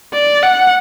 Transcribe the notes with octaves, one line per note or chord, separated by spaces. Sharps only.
D5
F#5